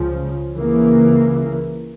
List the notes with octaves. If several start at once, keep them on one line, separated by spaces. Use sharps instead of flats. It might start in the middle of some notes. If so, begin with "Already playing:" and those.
Already playing: C#2 C#3 F3
C#2 C#3 E3 A#3